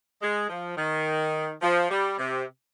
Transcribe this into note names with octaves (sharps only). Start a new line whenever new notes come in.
G#3
F3
D#3
F3
G3
C3